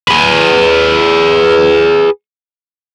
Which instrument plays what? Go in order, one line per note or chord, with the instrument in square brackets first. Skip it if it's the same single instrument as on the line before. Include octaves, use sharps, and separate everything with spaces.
[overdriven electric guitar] G#4 B4